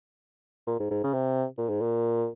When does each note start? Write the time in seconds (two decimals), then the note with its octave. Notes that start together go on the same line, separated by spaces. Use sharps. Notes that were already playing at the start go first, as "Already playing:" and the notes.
0.67 A#2
0.79 G#2
0.91 G#2
1.04 C#3
1.13 C3
1.58 A#2
1.69 G#2
1.81 A#2